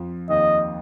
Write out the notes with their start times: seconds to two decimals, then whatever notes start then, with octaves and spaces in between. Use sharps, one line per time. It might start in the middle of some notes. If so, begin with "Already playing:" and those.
Already playing: F2 F3
0.29 D#2 D#3 D#5